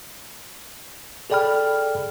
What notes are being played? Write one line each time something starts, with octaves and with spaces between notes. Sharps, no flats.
G#4 A4 D5 G5 B5 F6